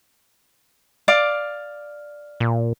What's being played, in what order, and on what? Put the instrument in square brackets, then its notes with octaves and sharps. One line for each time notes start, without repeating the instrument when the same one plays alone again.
[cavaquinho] D5 F5 D6
[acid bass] A#2